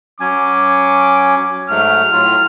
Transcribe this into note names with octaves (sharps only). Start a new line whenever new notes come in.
F#3 C#4 G#5 D6
G#2 F#3 A3 F6
A2 F#3 F4